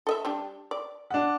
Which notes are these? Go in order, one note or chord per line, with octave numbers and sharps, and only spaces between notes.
A4 D#5 E5
G3 D4 G4
D5
D4 F#5